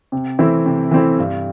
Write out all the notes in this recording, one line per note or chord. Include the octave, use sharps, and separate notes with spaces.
C3
E3 A3 C4 E4
C3
E3 A3 C4 E4
G2